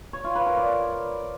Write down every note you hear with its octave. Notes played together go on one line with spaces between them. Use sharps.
C#5
F4
B4
A#4
D5